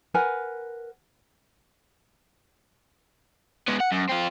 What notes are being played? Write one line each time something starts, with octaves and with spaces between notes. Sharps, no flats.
A#4 B4 F#5 G#5
G#3 B3
F#5
F#2
C4 F4